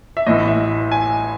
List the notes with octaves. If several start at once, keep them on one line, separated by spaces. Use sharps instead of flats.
E5
A1 A2 E3 D#5
E5
G#5